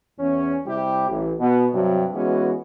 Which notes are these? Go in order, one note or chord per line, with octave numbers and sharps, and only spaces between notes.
E2 C#4
C3 G3 E4 G4
A1
B2 B3
G2 C3 F#3
E3 G#3 B3 C#4 F#4